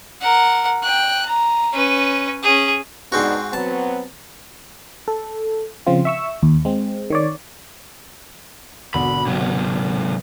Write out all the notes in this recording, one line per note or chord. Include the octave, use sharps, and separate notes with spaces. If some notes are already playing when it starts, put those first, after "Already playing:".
A#4 F#5
G5 F#6
A#5
C#4 B4
C#4 G#4
G#2 B3 C4 D4 D#4 F#4
F#3 B3 C4 A5
A4
C#3 F3 C4 F4
E5 C#6 E6
D#2
G#3 C4
D#3 C#5 D5
G#1 B2 D3 B5
C3 F#3